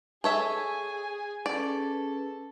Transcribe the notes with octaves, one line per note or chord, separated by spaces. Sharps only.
G#4 A4 C#5 E5 G#5
C#4 G#4 A4 B4 D5